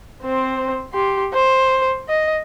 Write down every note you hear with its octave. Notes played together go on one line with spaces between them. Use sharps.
C4 C5
G4 C6
C5
D#5